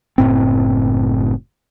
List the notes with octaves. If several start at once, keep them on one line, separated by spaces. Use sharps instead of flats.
F#1 A2 C4